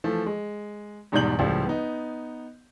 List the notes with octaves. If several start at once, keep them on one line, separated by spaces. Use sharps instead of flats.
E3 F3 A3
G#3
E2 G#2 B2 G3 G6 F#7
C#2 A2 F3 G3
B3 D#4